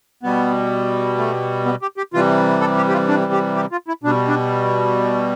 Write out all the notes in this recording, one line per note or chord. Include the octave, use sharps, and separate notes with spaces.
B2 G3 B3
A3
B3
G4
G4
C3 E3 G3 F4
A4
G4
G4
F4
D4
G4
G4
F4
E4
B2 G3 D4
D4